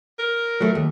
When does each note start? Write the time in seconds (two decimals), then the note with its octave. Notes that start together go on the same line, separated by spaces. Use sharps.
0.19 A#4
0.61 F#3 A3
0.75 D#2